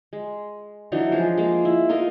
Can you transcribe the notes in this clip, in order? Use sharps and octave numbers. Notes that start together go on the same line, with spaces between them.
G#3
E3 F#3 D4 D#4
F3 G#3 G#4
G#3 A#3
E4
D#4 F4 A#4 D#5